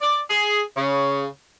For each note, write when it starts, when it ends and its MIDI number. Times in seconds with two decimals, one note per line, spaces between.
0.01 0.19 74
0.30 0.61 68
0.77 1.26 49